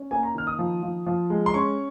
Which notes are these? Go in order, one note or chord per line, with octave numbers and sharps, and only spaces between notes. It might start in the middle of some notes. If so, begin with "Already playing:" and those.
Already playing: C#4
A#3 G#5
A#5
D#3 F6
D#6
F3
F3
F3
G#3
C6
C#4 C#6